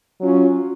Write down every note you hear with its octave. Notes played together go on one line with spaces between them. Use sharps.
F#3 C#4 F4